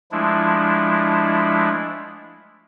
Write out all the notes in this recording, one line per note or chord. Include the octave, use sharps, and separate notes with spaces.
F3 G#3 A3 D4 E4